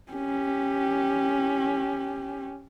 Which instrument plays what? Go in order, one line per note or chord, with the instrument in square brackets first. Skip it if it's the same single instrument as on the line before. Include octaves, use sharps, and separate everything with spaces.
[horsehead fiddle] C#4 G4